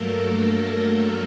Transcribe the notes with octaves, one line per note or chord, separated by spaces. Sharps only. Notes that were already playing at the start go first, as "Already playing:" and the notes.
Already playing: G2 F#3 A3 A#3 A4 A#4
A4